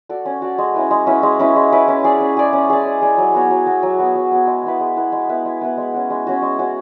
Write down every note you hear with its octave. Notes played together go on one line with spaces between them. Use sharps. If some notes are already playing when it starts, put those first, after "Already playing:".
F#4 A4 D5
C#4
F#4 A4 D5
G#3
C#4 E4 B4
G#3
C#4 E4 B4
G#3
C#4 E4 B4
G#3
C#4 E4 B4
C#4
G#4 D5
C#4
G#4 D5
C#4
G#4 D5
C#4
G#4 D5
F#3
B3 F#4 C#5
F#3
B3 F#4 C#5
F#3
B3 F#4 C#5
F#3
B3 F#4 C#5
G#3
B3 E4 B4
G#3
B3 E4 B4
G#3
B3 E4 B4
G#3
B3 E4 B4
G#3
C#4 F#4
G#3
C#4 F#4
G#3
C#4 F#4